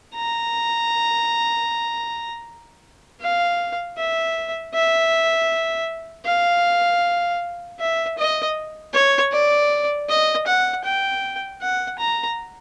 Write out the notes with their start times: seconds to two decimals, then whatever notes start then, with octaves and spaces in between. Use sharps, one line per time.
0.15 A#5
3.21 F5
3.97 E5
4.74 E5
6.26 F5
7.80 E5
8.18 D#5
8.93 C#5
9.32 D5
10.09 D#5
10.47 F#5
10.84 G5
11.61 F#5
11.99 A#5